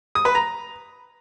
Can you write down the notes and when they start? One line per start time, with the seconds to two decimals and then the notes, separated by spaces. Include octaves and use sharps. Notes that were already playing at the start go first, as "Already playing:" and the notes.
0.15 D#6
0.25 B4
0.35 A#5